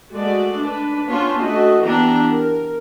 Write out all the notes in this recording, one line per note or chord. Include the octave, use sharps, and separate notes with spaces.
G#3 A3 F#4 A4 D5
D4 B4
B3 C#4 D4 F4 C5 C#5
A3 F#4 D#5
E3 B3 D4 G4 A#5
A#4